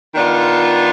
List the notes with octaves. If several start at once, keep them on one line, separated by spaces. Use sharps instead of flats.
D#3 B3 D4 F4